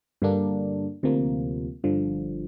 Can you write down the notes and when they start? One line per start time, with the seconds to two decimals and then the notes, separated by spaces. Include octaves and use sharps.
0.22 G2 D3 A#3 D4
1.03 D2 C3 F3 A#3
1.84 G1 G2 D3 F3